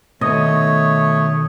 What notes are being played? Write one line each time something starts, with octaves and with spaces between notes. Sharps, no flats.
B2 D#3 A3 C#5 D#5